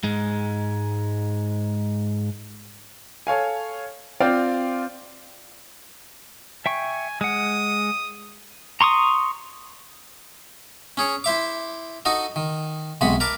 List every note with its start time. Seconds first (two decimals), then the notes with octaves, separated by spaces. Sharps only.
0.04 G#2 G#3
3.27 A4 C#5 F5 G#5
4.20 C4 F4 D5 F5 G5
6.66 E5 G5 G#5 C#6
7.21 G#3 F#5 D#6
8.81 A#5 C6 C#6 D#6
10.97 C#4 G#4 C#5
11.24 E4 C5 E5 D6
12.05 D#4 F#4 A4 D#5
12.36 D#3
13.01 B1 C3 G#3 F#4 B5
13.20 A#4 B4 A5 D6